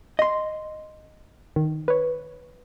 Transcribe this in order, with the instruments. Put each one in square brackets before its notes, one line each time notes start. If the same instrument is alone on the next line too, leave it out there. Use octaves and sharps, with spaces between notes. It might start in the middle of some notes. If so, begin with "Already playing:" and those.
[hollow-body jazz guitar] D#5 C6
[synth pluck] D#3
B4 C#5